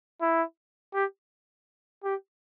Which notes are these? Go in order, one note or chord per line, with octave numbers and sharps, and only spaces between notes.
E4
G4
G4